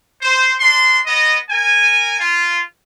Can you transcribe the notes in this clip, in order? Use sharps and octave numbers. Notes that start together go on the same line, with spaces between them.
C5
D4 C6
B3 D#5
A#4 G#5
F4